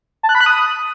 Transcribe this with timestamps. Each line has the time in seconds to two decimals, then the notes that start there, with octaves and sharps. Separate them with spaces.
0.23 A5
0.29 F#6
0.35 B5
0.41 F#6
0.46 D#6